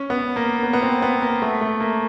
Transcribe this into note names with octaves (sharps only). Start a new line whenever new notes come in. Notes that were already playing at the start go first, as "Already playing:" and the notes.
Already playing: C#4
B3
A#3
B3
B3
C4
B3
A#3
A3
A3
A#3